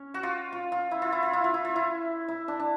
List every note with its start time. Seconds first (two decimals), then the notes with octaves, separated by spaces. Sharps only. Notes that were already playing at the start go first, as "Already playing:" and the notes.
Already playing: C#4
0.14 F#4
0.23 F4
0.52 F4
0.72 F4
0.91 E4
1.02 F4
1.12 E4
1.23 F4
1.33 E4
1.44 F4
1.54 E4
1.65 F4
1.76 E4
2.28 E4
2.48 D4
2.60 D4